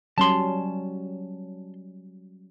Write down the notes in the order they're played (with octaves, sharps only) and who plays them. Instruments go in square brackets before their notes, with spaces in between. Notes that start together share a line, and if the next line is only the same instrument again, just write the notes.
[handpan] F#3 G3 C#4 [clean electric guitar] A5 C6